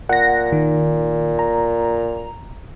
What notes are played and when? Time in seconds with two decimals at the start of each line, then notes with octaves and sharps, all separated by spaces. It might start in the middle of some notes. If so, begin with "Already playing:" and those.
0.09 A#2 F#5 A#6
0.52 D#3
1.39 A#5